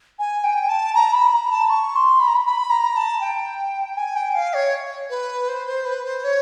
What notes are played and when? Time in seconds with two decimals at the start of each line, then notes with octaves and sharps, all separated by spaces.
0.19 G#5
0.44 G5
0.68 A5
0.94 A#5
1.13 B5
1.32 A#5
1.51 A5
1.69 C#6
1.96 C6
2.20 B5
2.27 A#5
2.35 B5
2.46 B5
2.70 A#5
2.96 A5
3.21 G5
3.97 G#5
4.15 G5
4.35 F5
4.54 C#5
5.10 B4
5.48 C5
5.67 C5
5.85 B4
6.05 C5
6.24 C#5